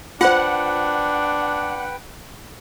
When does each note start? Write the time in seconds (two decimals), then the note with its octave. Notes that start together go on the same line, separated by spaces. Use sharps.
0.21 D4 F4 B4 C5 F#5 G5